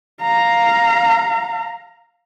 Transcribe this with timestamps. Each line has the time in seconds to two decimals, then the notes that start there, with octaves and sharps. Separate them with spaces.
0.21 F5 A#5